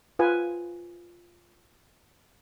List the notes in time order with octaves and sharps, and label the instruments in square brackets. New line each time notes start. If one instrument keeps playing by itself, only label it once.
[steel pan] F4 B4 G#5